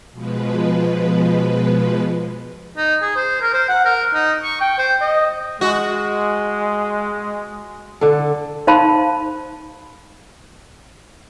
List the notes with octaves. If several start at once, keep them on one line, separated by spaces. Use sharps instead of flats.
B2 F3 G#3 B4
D#4
G#4
C5
A#4
C5
F#5
A#4
D#4
C#6
G5
C5
D#5
G#3 F#4
D3 A4
D#4 C5 F5 A5 B5 C6